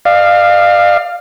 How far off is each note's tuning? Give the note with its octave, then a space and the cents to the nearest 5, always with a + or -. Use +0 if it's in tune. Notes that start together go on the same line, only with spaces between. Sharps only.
D5 +45 F5 +0